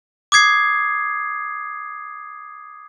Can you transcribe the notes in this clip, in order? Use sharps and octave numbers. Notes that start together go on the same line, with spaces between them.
D6 D#6 G#6 C7